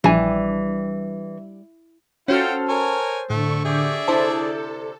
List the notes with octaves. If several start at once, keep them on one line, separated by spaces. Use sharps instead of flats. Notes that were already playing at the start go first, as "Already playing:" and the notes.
A#1 E3 G3 D4 G#5
C#4 F4 F#4 A4 C5 G5 F6
A#4 C#5 G#5
A2 D3 A3 C#6
G4 G#4 D5 E5
C3 D4 E4 A4 C5 A5